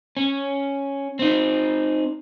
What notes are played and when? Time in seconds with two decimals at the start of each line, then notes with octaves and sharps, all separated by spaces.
0.17 C#4
1.19 C4 D#4